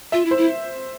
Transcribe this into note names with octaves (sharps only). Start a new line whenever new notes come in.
F4 E5
E4
C5
E4